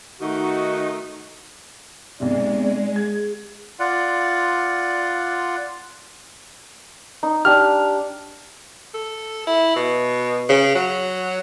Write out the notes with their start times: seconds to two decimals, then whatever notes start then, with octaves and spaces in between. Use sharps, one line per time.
0.21 D#3 A3 D#4 F#4
2.20 B1 C3 G#3 D5
2.96 G#4 G#6
3.80 F4 D5 F#5
7.23 D#4
7.45 D4 G4 F6
8.94 A4
9.47 E4
9.76 B2
10.49 C#3
10.75 F#3